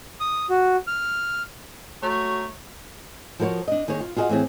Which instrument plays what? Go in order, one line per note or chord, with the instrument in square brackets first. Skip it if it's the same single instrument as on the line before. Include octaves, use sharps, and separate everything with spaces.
[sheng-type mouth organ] D#6
F#4
F6
[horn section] A3 F#4 C#5 A#5
[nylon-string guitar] F3 F#4 A#4 C5 C#5
D4 D#5
D#3 A#3 G#4 C#5
F4
F4 F#4 G#4 C#5 D#5 F#5
A2 E3 C4 G#4